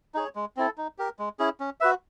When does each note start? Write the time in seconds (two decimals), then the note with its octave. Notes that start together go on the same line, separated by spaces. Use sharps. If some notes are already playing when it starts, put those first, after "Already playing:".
0.14 D#4 G#4 C#5
0.35 G#3
0.57 C4 E4 A4
0.78 D#4
0.98 G4 A#4
1.19 G#3
1.39 C#4 E4 G#4
1.60 C#4
1.80 F#4 B4 E5